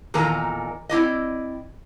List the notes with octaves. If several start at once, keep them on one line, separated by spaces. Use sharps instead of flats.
E2 A#2 D#3 A4 A#4 A#5
C4 E4 D5 D#5